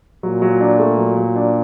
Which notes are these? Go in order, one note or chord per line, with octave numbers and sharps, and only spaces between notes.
A#2 F#3
F#3
D4
A3
F#3
F#3
D4